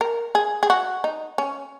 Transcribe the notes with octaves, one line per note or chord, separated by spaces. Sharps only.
A#4
G#4
G#4
F#4
D#4
C#4